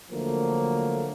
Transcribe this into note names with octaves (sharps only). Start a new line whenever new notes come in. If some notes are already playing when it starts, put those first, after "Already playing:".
D3 F3 F#3 A3 A#3